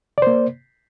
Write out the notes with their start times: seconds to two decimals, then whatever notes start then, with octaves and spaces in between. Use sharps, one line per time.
0.18 D5
0.22 C5
0.27 A#3